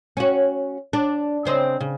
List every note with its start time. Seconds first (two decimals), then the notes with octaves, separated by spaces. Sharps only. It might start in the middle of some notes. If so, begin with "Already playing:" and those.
0.17 C#4 F#4
0.93 D4
1.45 C#3 C4 D#5
1.80 C#3